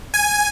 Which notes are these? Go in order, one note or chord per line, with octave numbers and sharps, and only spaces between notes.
G#5